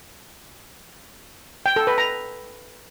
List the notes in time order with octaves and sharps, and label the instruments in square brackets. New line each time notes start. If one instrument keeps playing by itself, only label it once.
[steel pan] G5
A4
B4
A#5